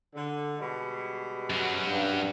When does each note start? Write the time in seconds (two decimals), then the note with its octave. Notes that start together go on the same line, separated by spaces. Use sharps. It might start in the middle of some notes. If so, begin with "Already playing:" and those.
0.15 D3
0.57 B2 G3 G#3
1.50 F#2 F#3
1.87 G2